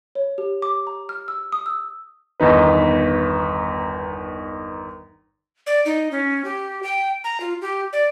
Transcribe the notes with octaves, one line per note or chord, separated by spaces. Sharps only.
C#5
G4
D6
A#5
F6
E6
D#6
E6
G1 E2 D#3 D#4 B4
D5
D#4
C#4
G4
G5
A#5
F4
G4
D5